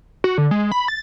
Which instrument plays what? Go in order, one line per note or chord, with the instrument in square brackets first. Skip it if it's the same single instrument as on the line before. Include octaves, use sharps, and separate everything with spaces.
[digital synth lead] F#4
D3
G#3
B5
A6